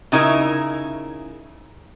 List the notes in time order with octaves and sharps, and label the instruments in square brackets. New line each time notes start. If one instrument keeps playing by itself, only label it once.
[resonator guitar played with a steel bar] C#3 D#4 E4 A#4 E5